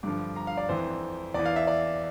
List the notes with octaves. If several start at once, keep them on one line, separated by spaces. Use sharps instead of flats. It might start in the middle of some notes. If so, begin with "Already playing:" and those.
G2 D3 F3 D6
A#5
F5
D5
F2 E3 C5
E2 E3 D5
F5
E5
D5